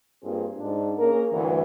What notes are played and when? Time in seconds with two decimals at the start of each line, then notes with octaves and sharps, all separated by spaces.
0.22 G2 A#3 C4 F4 G#4
0.57 G#2 D4
0.98 A#3 C#4 G#4 A#4
1.31 D2 G2 E3